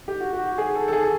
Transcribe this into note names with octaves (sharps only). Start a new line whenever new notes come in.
G4
F#4
F#4
G#4
A4
A4
G#4